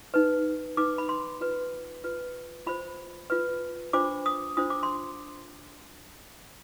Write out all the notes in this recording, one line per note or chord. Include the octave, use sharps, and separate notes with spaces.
D#4 B4
D#4 B4 D6
B5
C6
F4 B4
F4 B4
F4 C5 B5
F4 B4
D4 F4 C5 D6
D#6
D4 F4 C5 D#6
D6
C6